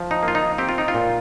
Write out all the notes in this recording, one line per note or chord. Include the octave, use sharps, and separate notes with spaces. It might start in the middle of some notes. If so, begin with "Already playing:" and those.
Already playing: F3
D#4
A#3
F4
D#4
C4 G4
F4
D#4
F4
A#2